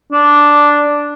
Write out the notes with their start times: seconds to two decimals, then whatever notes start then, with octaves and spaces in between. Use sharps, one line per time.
0.12 D4